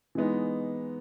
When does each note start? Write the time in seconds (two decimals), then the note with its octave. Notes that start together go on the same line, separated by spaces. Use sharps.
0.15 E3 G#3 B3 D#4